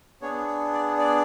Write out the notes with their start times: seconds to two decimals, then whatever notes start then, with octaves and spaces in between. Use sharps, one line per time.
0.22 B3 D4 G#4 C#5
0.72 D5
0.98 D5